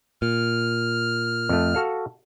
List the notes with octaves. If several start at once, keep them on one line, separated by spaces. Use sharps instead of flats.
A#2 F6
F2 A3
F#4 A4 F5